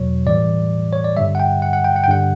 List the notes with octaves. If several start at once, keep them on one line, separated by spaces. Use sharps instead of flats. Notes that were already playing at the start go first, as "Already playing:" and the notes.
Already playing: E2 B2 F#3 C#5
A2 E3 G3 D5
C#5
D5
G2 D3 G3 E5
F#5
G5
F#5
F#5
G5
F#5
G5
G2 D3 G3 F#5